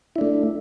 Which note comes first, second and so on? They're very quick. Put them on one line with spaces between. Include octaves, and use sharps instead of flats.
E4 D4 A3